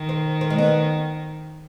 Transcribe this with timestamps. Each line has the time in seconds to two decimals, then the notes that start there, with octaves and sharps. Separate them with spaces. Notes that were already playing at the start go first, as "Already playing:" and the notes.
Already playing: D#3
0.09 C4
0.41 C4
0.50 G#3
0.59 B3